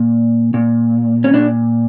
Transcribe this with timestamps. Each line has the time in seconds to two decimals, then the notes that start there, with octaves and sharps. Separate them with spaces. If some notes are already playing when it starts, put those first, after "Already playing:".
Already playing: A#2
0.54 A#2
1.24 C#4
1.34 A#2 D4